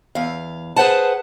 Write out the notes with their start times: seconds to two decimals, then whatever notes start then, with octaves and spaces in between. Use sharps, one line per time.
0.15 E2 F5
0.76 G#4 B4 C5 F#5 A5